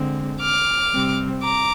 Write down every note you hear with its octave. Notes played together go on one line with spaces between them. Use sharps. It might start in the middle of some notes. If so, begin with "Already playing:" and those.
Already playing: D3 G#3 C4
D6 F6
C3 G3 C4
A#5 D6